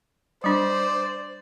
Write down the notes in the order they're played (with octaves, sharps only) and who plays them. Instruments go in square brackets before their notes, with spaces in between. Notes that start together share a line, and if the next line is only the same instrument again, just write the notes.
[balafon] G3 D4 [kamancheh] C5 [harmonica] D5